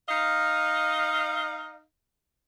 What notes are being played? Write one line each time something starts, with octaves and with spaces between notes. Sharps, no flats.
D#4 D#5 F5